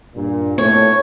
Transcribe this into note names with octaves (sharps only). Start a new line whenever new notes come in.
G2 A#2
A2 C#5